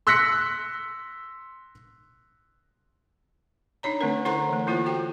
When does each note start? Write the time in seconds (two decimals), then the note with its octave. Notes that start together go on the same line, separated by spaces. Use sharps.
0.07 C6 E6 F#6 A#6 B6 C#7
3.83 D4 D#4 C#5 A#5
4.01 D3 A3 C4 C#4 A#4
4.25 E4 A4 C5 F#5 A#5 C6
4.49 E3 A3
4.67 A#3 E4 F4 A4 C5
4.86 F#4 G5